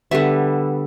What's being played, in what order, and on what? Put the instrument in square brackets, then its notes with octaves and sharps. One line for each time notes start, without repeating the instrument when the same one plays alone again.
[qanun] D3 G3 B3 E5